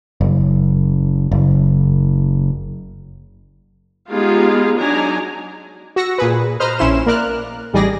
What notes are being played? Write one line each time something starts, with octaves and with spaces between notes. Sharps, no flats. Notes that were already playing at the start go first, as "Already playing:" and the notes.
F#1
F#1
G#3 B3 D#4 F4 G4 G#4
F#3 D4 D#4 G#5 A#5
F#4 E6 A#6 C#7
A#2 G#4 B4
B4 C5 D#5 A#5 F6
A#1 C#4 E4 C6 E7
A#3 A#4 D5 F6 F#6
A1 G3 D#4 G#4 D5 A#6